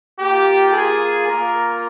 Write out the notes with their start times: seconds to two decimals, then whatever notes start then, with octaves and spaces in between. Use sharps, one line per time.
0.20 A#3 F4 G4
0.73 G#4
1.26 A#3 F4 A#4